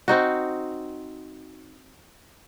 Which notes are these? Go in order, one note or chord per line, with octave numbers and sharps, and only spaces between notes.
C4 D#4 F#4